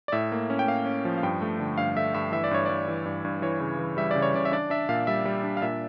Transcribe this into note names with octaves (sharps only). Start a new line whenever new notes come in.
D5
A2 E5
A#3
C#4
G5
A#3 F5
C#4
F3
F5
G2 G5
A3
D3
G2 F5
A3 E5
G2 E5
E3 E5
D5
G2 C#5
G2 D5
E3
G2
G2
E3 C#5
C#3
E3
G3 E5
C#3 D5
C#5
C#3 D5
E5
D4 D5
D4 E5
A#2 F5
G3 E5
G3
D4
F5
A#2 E5